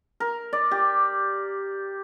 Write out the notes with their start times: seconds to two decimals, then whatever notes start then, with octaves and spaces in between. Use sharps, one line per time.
0.20 A#4
0.53 D5
0.71 G4